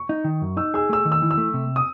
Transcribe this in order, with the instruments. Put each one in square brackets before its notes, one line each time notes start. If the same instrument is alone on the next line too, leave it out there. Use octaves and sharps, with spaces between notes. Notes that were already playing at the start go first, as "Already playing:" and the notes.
Already playing: [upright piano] C#6
[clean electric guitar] D#4
D#3
F#2
[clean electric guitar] D#4 [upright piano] E6
[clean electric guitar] G#4 [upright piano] E6
[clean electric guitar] A3 [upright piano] E6
[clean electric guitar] D#3
[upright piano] E6
[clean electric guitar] E3
[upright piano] E6
[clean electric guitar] A3
C3
[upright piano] D#6